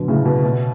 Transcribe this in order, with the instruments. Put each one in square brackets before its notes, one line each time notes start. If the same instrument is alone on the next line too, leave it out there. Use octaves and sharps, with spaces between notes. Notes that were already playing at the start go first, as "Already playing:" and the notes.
Already playing: [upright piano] B2 D3 F#3
A2 C#3
B2
B2